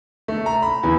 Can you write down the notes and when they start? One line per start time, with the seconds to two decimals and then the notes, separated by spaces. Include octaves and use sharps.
0.28 A3
0.46 A#5
0.62 B5
0.83 E2